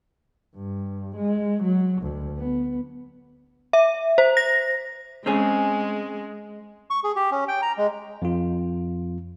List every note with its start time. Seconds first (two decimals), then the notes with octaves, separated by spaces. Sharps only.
0.56 G2
1.17 G#3
1.64 F#3
2.02 D2
2.38 B3
3.73 E5
4.18 C5
4.37 A#6
5.26 G#3 C4 C#4 G#4
6.90 C#6
7.04 G#4
7.16 G4
7.31 C#4
7.48 G5
7.62 A#5
7.78 G#3
8.22 F2 F4